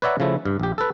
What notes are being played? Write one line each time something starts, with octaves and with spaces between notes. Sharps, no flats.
B4 C#5 D5 E5 F#5 A#5
C#3 F3 A3 E4
G2
A#1 G4
A4 B4